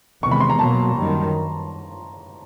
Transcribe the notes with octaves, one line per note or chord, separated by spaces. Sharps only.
E2 C3 D#3 G#3 C#6
B5
C6
A#5
B2 F#3 A#3 A5
F#2 D#3 G3